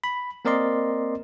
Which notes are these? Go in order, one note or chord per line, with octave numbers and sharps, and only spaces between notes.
B5
A#3 C4 A#4 D5 D#5 C6